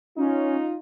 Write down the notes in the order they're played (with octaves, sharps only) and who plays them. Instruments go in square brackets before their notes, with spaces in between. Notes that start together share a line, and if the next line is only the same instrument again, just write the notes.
[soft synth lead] C#4 [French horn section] D#4 F4